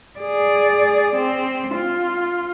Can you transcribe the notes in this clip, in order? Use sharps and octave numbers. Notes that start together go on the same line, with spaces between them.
G#4 D5
C4
F4